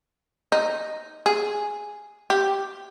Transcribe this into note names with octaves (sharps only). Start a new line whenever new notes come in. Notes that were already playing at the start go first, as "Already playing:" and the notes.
D#4
G#4
G4